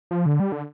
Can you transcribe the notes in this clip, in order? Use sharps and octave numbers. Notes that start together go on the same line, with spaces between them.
F3
D3
G3
D3